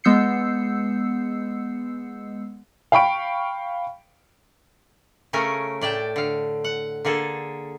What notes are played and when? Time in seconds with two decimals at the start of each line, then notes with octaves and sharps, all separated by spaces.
0.04 G#3 B3 E6 G6 C7 C#7
2.92 F5 G5 B5 C#6 D7
5.33 C#3 A3 C#4 A#4 G#5
5.81 A2 D5 G5 A5
6.16 D3 F5
6.64 F#5
7.05 D3 A#3 G#4 A4